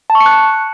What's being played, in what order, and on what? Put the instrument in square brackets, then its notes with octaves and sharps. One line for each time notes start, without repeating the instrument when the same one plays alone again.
[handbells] A5
C#6
C#7
F#6
C#7